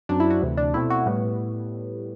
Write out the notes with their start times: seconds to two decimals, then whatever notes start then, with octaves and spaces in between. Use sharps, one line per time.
0.09 F#2 F#3 C4 D4
0.20 E4
0.30 F#4
0.41 D2 C3 E3
0.57 D4
0.74 B2 A3 C4 E4
0.90 F#4
1.06 A2 G3 B3